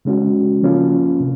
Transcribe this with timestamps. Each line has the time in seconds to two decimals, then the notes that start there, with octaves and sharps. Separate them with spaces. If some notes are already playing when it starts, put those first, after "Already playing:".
0.05 C#3 G#3 C#4 F#4
0.62 F3 A#3 C#4 F4
1.20 C3